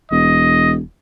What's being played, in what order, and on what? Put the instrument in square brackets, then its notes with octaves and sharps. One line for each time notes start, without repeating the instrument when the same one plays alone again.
[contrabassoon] E1 [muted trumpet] D#5